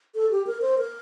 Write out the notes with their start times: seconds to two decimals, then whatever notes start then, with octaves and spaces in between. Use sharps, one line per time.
0.15 A4
0.31 G4
0.47 A#4
0.62 C5
0.78 A#4